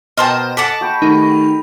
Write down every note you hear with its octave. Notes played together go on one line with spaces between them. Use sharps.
B2 A#4 C5 D#5 G5 A5
A4 F#5 A5 D6 B6
F#4 G5 B5
D#3 A3 D#4 G4